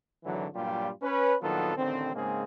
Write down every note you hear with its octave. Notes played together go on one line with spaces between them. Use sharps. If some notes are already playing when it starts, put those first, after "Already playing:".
G#1 D3 E3 F#3
G2 A#2 F#3 G3 F4 G4
C#4 B4
A#1 D#3 F#3 B3 F4 A4
A1 D3 D#3 C4
G#2 C#3 G#3 A#3 C4 G#4